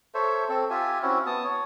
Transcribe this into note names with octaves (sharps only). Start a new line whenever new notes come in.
A4 C5 C#5 E5
C4 A4
F4 G4 E5 G#5
C4 C#4 E4 F#4
B3 A5 D#6
C#5